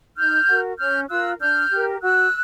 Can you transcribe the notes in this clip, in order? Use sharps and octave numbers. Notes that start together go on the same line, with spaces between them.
D#4 F6 G6
F#4 A#4
C#4 F6 G6
F4 A#4 E6 F#6
D4 F6 G6
G4 A#4
F#4 E6 F#6